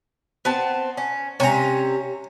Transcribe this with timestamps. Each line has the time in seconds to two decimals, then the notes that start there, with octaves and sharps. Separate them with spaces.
0.45 B3 C4 A5
0.97 C#4
1.40 C3 C#4 C#5 A#5